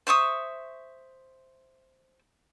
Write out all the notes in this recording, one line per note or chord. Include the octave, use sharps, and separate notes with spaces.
C5 E5 C#6 D#6